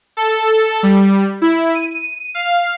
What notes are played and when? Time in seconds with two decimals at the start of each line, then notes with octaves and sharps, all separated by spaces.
0.17 A4
0.83 G3
1.42 E4
1.75 D#7
2.35 F5